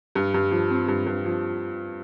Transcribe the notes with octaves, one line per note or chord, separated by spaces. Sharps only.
G2
G2
F3
C4
G2
G2
F3